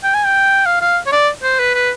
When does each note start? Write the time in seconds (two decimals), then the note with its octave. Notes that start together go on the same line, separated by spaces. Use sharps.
0.03 G5
0.14 G#5
0.25 G5
0.66 F5
0.81 F5
1.07 C#5
1.12 D5
1.43 C5
1.59 B4
1.74 B4